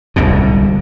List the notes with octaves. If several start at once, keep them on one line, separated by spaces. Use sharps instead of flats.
D1 C2 G#2 B2